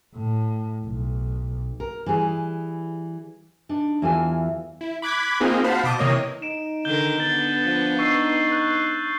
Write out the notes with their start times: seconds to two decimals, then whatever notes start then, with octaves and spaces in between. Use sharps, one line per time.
0.15 A2
0.86 B1
1.80 A#4
2.06 E3 G3 G#4
3.69 D4 D#4
4.02 E2 E3 F4 G4 A4 G#5
4.81 E4
5.02 B5 D6 F#6 G#6 B6
5.40 A#3 C4 D#4 F4 G#4
5.64 F#4 C5 F5 F#5 A5 B5
5.84 B2 A5 D6 D#6 G6
5.98 C3 E3 A#3 C#5 D#5 D#6
6.42 D#4 D7 E7
6.85 D3 D#3 A#4 G6 G7
7.20 B3 D4 A6 F#7
7.65 F3
7.99 D#4 C#6 E6 C7
8.52 F#6 G6